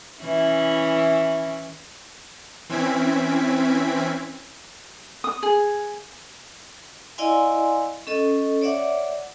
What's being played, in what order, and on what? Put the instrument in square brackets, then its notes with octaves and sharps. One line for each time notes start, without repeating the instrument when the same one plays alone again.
[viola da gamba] E3 C#4 E4
[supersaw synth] E3 C4 C#4 G#6 B6 D7
[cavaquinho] D#6
G#4
[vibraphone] E4 D5 D#5 F5 G#5 C6
C#4 A4 D#5
C#5 D5 E5 F#5 D6